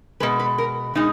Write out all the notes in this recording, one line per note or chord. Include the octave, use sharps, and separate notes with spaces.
B2 G#3 B4
B4
A#4
B2 G#3 D#4